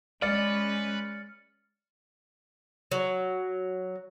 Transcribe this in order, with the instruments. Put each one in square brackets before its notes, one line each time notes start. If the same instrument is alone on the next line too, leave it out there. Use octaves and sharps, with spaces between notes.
[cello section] G#3 C#4 [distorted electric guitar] B4 [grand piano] D5 [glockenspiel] F6 A6 C#7
[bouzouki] F#3